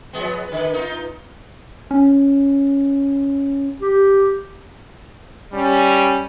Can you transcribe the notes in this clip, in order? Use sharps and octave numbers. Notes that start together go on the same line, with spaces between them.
F3 G#3 B3
D3 B4
D#4 F4
C#4
G4
G3 C#4